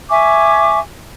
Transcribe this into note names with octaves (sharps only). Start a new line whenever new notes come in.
E5 G#5 C#6 D6